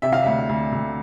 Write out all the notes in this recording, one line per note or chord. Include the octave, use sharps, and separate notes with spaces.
C3 E5
F5
D2 E5
D2
D2